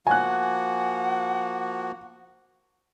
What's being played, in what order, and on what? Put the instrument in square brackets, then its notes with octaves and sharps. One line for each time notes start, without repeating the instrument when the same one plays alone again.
[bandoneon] F3 A#3 F#4 [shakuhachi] F#5 [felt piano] G#5 F#6